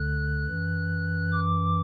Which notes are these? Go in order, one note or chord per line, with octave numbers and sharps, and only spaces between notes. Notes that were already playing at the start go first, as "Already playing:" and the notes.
Already playing: D2 D3 F#6
F#2 E3
D6